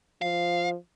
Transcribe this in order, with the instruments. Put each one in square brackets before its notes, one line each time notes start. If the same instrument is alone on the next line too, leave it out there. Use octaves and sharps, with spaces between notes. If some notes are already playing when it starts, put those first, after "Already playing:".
[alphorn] F3 [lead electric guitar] F5